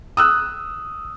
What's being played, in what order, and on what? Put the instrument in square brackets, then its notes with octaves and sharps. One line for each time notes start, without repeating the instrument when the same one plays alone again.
[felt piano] D#6 E6 F#6